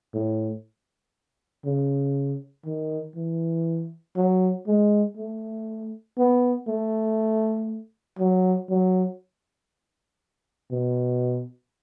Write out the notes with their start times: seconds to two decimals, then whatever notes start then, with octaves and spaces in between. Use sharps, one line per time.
0.14 A2
1.65 C#3
2.65 D#3
3.16 E3
4.16 F#3
4.67 G#3
5.17 A3
6.18 B3
6.68 A3
8.19 F#3
8.70 F#3
10.71 B2